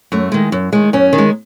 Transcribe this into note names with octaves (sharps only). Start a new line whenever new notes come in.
F#2 A3
D#3 G#3
F#2
D#3 G#3
F#2 C#4
D#3
G#3